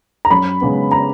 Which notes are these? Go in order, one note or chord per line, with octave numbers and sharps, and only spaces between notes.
A#5
F#2 B5
C#3 G#3 B3
A#5